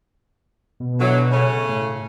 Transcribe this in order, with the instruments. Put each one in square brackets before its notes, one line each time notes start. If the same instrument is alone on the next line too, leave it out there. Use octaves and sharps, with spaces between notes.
[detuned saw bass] B2
[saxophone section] D3 E3 F#3
C#3 A3 C#4
[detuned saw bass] A2